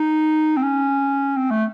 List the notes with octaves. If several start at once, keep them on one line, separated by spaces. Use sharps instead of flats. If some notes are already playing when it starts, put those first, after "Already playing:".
Already playing: D#4
C4
C#4
C4
A3